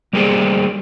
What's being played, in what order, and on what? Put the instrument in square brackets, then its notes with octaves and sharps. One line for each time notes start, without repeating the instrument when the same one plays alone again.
[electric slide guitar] G3 A#3 G4 G#4 C5 D5